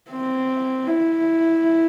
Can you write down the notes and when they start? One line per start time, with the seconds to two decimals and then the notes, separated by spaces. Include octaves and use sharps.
0.10 C4
0.88 E4